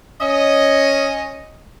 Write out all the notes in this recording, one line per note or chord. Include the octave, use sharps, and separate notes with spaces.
C#4 D#5